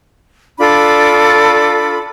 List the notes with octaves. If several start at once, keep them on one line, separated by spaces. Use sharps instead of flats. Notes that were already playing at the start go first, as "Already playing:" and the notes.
D4 F4 A4 B5